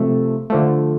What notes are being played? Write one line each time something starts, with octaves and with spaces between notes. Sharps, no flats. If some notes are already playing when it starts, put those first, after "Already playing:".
Already playing: C3 F3 A3
D3 F3 A3